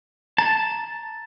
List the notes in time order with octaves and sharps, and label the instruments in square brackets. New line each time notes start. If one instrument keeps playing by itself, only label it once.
[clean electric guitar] A5 [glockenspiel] A#5 A6